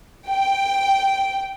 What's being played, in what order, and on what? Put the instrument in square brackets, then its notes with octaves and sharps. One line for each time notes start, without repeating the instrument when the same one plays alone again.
[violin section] G5